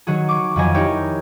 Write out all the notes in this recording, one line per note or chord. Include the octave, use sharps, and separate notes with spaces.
D#3 F#3 F#4 G#4
C#6 D6
F2 D#3 F#3 D#5 G#5
D#4 E4 G4 A#4 C#5